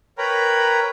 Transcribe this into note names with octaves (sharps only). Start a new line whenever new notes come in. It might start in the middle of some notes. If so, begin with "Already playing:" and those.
A#4 B4 C#5 G5 A#5 B5